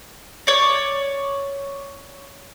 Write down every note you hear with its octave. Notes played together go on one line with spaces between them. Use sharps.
C#5 D5